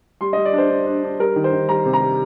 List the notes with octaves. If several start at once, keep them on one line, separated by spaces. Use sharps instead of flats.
G3 C6
D#5
G3
D5
D4 C5
D4
D4
D4
G3 A#4
D#3
C5
D#3
G3 A#5
C3
A#5
G3